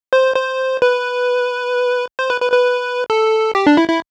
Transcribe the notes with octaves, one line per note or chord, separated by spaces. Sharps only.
C5
C5
B4
C5
B4
B4
B4
A4
G4
D4
E4
E4